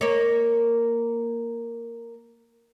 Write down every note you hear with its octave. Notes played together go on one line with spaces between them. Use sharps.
A#3 C#5